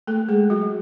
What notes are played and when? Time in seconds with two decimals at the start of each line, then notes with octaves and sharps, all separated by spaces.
0.07 A3 A4
0.29 G#3 G#4
0.50 F#3 F#4